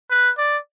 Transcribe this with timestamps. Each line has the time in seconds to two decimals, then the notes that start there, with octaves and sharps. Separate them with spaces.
0.10 B4
0.38 D5